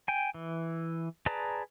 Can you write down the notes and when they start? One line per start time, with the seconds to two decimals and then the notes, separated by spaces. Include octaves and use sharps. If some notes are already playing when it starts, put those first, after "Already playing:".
0.08 G5 G#5
0.34 E3
1.26 G#4 B4 D5 A5 A#5